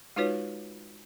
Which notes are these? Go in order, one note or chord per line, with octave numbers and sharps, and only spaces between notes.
G#3 D#4 F4 F#4 B4 C#5